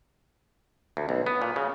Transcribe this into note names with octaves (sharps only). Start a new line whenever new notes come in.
D2
B1
B3
A#2
C#3